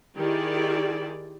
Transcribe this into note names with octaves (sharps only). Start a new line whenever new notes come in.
D#3 E4 G4 G#4 D5